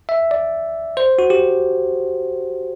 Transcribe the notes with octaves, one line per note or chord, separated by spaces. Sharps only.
E5
D5
C5
F#4
G4